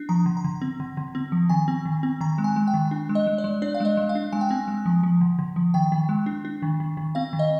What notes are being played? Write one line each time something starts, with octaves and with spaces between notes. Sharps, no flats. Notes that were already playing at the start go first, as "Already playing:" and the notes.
Already playing: D4
F3 A#5
D3
A#5
D3
C4
D3
D3
C4
F3
D#3 G#5
C4
D#3
C4
D#3 A#5
G#3
G#5
G#3
G5
D#3
D4
G#3
D#5
G#3
D5
G#3
D4 D5
F5
G#3 D#5
G#3
F5
D4
G#3 G#5
G5
C4 G#5
G#3
F3
F3
D3
D3
F3
D#3 G5
D#3
G#3
D4
D4
D#3
D#3
D#3
C4 F5
D#3
D#5